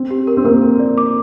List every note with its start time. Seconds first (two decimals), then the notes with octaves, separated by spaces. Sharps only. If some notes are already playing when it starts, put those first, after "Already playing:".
Already playing: C4
0.11 G4
0.27 A#4
0.37 C4
0.44 A#3 A#4
0.62 A#4
0.79 D5
0.98 D6